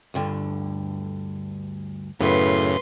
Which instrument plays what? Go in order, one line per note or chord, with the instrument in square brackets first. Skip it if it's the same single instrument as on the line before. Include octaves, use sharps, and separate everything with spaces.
[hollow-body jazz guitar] D2 G2 D3
[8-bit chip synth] F#2 C#3 [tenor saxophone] A2 [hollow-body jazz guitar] B3 [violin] B4 C6